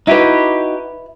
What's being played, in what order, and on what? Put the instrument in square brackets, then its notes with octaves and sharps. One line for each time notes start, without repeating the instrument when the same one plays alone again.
[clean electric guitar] D#4 F#4 G4 [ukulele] E4 B4